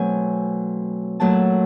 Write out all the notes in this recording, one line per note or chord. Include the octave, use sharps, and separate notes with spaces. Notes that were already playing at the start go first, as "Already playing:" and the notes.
Already playing: B2 F#3 A3 C4 G#5
A#2 F#3 A3 A5